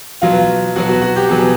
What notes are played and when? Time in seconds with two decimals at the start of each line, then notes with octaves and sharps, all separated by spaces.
0.22 B2 F#3 B3 F4
0.76 B2 F#3 B3 F#4
0.89 F#4
1.02 F#4
1.16 G4
1.29 B2 F#3 B3 G#4